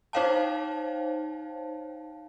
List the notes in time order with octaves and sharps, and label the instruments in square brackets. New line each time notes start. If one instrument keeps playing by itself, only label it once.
[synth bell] D#4 C5 C#5 F5 G5 A5